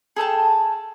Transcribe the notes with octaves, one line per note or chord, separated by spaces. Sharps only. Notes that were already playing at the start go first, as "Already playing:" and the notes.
G#4 A4 G5 A5